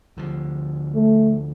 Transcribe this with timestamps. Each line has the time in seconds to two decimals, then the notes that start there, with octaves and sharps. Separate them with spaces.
0.17 D2 D3 F3
0.95 A3